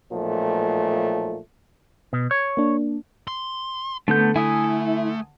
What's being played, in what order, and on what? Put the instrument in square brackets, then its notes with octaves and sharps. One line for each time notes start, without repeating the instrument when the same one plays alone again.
[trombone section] B1 A#2 F3 A3
[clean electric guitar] B2
C#5
[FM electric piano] A#3 D4
[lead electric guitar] C6
[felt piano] D3 [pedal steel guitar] A3 B3 G6
[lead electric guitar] A3 [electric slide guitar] E4 [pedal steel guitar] G#5 D#6